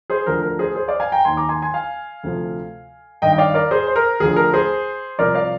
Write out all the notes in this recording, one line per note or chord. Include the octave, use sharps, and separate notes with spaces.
G#4 C5
D2 D3 F3 A#4
A#4
G#4 C5
G#4 C5
D5 F5
F5 G#5
G5 A#5
D#2 D#3 G#5 C6
A#5 D6
G#5 C6
G#5 C6
F5 G#5
D2 C3 F3
G2 D#3 D#5 G5
G5
D5 F5
A#4 D5
G#4 C5
C5
A#4
D2 D3 F3 G#4
A#4
G#4 C5
C2 C3 F3 A#4 D5
D5 F5